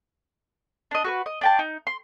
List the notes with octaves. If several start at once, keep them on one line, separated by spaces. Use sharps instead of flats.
D4 D#5
F#4 A4 B4
D#5
D4 G5 A5
D#4
C6